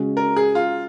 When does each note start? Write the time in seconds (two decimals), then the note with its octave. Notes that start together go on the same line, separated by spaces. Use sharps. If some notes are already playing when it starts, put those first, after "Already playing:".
Already playing: C#3 G#3 C#4 F#4
0.17 A#4
0.36 G#4
0.55 F4